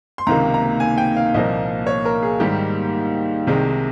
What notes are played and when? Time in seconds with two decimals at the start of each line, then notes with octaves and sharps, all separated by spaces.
0.18 C6
0.26 C#2 C3 D#3 A#3 A#5
0.54 A#5
0.80 G#5
0.98 G5
1.17 F5
1.34 C2 A#2 F3 A#3 D#5
1.87 C#5
2.05 A#4
2.23 G#4
2.40 G#2 D#3 G3 A#3 G4
3.47 C2 C3 D#3 G#3